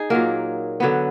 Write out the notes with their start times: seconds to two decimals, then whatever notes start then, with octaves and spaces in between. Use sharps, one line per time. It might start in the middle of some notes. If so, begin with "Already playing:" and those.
Already playing: D#4 G#4
0.10 A#2 F#3 A#3 A#4
0.80 D3 F#3 B3